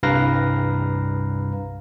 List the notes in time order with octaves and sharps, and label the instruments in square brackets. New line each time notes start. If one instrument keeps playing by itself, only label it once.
[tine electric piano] C2 G2 B4 F5 A#5 A#6